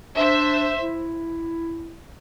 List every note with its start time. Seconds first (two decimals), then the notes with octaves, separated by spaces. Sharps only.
0.16 D4 C5 E5
0.81 E4